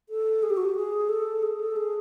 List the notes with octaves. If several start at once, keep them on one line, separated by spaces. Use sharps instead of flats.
A4
G#4
G4
F#4
G4
G#4
A4
G#4
A4
G#4